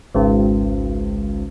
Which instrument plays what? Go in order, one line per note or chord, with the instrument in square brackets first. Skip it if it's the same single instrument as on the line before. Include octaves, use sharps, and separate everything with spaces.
[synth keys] G#1 C#2